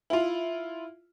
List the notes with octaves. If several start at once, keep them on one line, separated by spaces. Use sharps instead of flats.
E4 F4